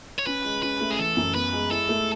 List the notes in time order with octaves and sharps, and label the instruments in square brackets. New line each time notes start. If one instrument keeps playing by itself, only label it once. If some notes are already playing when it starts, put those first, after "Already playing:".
[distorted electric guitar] C#5
[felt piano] C#4 [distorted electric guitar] B4
[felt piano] G#3
[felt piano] C#4 [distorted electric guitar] B4
[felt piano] A3
[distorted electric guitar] G#4
[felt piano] E3 [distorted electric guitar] A4
[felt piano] F#2
[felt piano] B3 [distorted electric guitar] B4
[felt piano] G#3
[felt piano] E4 [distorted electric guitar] A4
[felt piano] A3